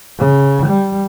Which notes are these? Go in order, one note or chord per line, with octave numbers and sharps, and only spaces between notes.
C#3
G3